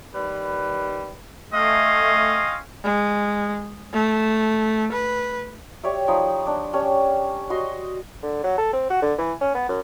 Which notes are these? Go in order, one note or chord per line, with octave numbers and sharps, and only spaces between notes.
D#3 G3 B4
A3 C4 C#4 D#5 F5
G#3
A3
B4
G4 C#5 D5 E5
F3 D#4 B5
D4
C#4 D4 G4
F#4 D#5 C6
D3
F#3
A4
C4
F#4
D3
E3
C#4
B3
F#2